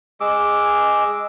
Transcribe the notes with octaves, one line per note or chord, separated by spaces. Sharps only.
G#3 G#4 D6 E6